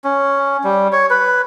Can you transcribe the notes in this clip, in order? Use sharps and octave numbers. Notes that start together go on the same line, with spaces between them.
C#4
G3
C#5
B4